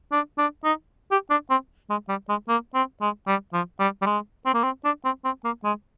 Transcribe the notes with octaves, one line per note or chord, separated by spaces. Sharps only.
D4
D4
D#4
G4
D4
C4
G#3
G3
G#3
A#3
C4
G#3
G3
F3
G3
G3
G#3
C4
A#3
C4
D4
C4
C4
A#3
G#3